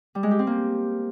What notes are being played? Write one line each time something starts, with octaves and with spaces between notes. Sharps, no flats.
G3
G#3
G4
C4
A#3